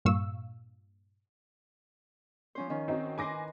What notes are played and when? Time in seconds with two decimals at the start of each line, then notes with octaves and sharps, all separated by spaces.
0.05 G2 A#2 F5 C#6 E6
2.55 F3 C#4 C5
2.70 D#3 C#4
2.88 C4 D#4 F#4
3.18 B4 C5 G#5 D6 A#6